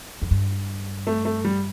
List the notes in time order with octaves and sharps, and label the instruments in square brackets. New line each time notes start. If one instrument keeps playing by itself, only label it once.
[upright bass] F2
G2
[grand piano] A3
A3
G3